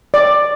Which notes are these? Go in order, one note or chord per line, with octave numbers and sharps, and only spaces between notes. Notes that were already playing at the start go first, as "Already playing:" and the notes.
D5